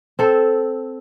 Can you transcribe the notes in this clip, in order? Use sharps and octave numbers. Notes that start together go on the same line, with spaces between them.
C4 A4